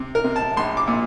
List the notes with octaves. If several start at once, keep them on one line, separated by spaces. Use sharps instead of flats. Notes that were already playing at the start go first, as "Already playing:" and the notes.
Already playing: C3
A#4
C3
A5
A#1 C6
D6
A#2